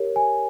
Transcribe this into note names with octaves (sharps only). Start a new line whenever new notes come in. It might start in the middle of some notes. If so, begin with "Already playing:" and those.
Already playing: G4 A#4 C#5
G#5